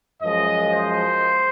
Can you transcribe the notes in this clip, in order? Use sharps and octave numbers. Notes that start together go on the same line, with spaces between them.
F#2 F3 G#3 D#5
C5